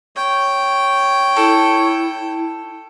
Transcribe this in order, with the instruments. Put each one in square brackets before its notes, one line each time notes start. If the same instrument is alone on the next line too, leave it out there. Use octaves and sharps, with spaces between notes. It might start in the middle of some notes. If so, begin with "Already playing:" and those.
[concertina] C#5 [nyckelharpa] G5
[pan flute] E4 [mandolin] A4